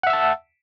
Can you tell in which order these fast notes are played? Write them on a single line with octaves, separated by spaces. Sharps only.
F#5 E5 E6 A5